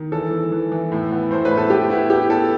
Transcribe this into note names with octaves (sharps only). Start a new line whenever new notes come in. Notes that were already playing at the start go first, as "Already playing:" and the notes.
Already playing: D#3
E3 A4
E3
E3
E3
A2
B3
A2 C5
B4
A2
A4
B3 G4
B3 E4
B3 G4
B3 A4